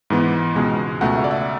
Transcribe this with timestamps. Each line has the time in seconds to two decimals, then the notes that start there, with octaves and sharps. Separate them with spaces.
0.10 G#2 E3 B3
0.55 C#2 B2 G#3 B3
1.01 C#2 B2 A3 F#5
1.16 E5
1.24 D5
1.31 E5